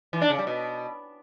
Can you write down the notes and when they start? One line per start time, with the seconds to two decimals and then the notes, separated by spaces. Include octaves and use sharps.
0.13 E3
0.21 D4
0.30 C#3
0.38 G3
0.47 B2